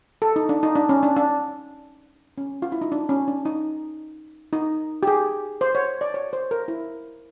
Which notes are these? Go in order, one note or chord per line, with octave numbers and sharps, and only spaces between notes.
A4
D#4
D4
D#4
D4
C#4
D4
D4
C#4
F4
E4
D#4
D4
C#4
D4
D#4
D#4
G4
G#4
C5
C#5
D5
C#5
C5
A#4
E4